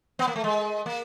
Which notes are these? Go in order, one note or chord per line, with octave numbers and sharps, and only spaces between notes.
B3
A#3
A3
G#3
A#3